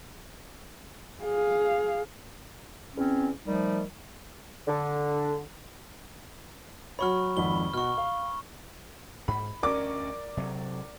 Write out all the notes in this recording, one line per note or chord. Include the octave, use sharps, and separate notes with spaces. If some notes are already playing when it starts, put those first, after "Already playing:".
G#4 F5
E2 C4 C#4
D#3 F3 G3 A3 D#4
D3
F#3 F#4 C#5 B5 C#6 F6
G#1 F2 B5 G7
B2 F#4 C#6 F6
F5
G#2 B5
D2 C#4 A#4 D5 D6
C3 F#3